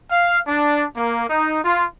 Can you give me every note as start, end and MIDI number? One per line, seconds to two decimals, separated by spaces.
0.10 0.38 77
0.45 0.85 62
0.95 1.29 58
1.29 1.58 63
1.63 1.84 65